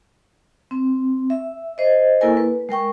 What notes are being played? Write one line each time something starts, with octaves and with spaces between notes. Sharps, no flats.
C4
E5
C5 D#5
A#3 E4 A4 A#4 G#5
B4
G#3 A#4 G5 C#6